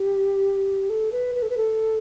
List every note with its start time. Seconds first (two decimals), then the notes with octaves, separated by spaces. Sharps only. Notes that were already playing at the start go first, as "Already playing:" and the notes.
Already playing: G4
0.90 A4
1.12 B4
1.35 B4
1.42 A4
1.50 B4
1.57 A4